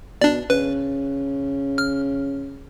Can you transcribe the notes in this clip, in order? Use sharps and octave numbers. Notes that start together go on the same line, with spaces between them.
B2 D4 D5
C#3 B4
F6